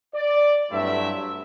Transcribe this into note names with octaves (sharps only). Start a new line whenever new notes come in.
D5
G2 F#3 A3 C4 E4 E5